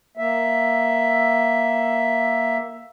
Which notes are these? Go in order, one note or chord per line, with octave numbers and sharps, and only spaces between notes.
A#3 E5